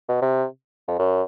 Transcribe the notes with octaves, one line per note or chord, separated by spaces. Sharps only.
B2
C3
F2
F#2